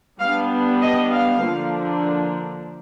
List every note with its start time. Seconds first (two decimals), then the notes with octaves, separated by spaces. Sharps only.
0.20 G3 B3 D4 F5
0.81 D#5
1.11 F5
1.41 D3 F3 A#3 D4